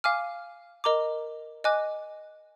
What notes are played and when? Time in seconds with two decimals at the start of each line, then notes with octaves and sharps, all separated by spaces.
0.04 F5 G#5 D6 F6
0.84 A#4 D#5 A#5 D6
1.64 D#5 G#5 D6 F#6